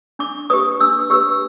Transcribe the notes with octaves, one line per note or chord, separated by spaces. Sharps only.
D4 D6
G4 B4 D#6
D4 E6
G4 B4 E6